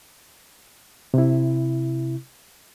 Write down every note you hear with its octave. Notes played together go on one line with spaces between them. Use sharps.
C3 E4